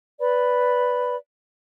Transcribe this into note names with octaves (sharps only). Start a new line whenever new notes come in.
B4 D5 B5